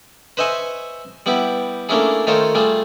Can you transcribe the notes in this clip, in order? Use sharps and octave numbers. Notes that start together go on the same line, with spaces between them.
B4 C5 D#5 E5 G#5 C#6
G3 B3 E4 G4
A3 A#3 C#4 D4 E4 G#4
D#3 A3 D#4 F4 C5 C#5
G3 A3 F4 G#4